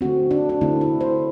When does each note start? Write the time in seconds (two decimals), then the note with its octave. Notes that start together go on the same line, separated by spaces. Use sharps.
0.01 D3 A3 C4 F#4
0.31 D4
0.49 D4
0.61 D3 A3 C4 E4
0.81 E4
1.01 C5